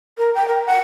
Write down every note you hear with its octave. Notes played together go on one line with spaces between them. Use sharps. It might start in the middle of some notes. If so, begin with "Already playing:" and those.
A#4
G5
A#4
F#5